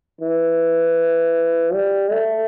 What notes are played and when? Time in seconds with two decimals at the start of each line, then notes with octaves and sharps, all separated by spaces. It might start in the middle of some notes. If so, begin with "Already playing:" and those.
0.21 E3
1.74 G3
2.12 A3